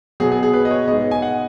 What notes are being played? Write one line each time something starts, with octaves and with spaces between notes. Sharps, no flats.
B2 F#3 B3 G#4
G#4
G#4
B4
D#5
C#5
G#2 G#3 B3 D#5
G#5
F#5